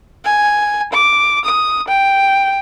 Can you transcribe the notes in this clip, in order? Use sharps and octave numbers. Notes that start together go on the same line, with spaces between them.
G#5
D6
D#6
G5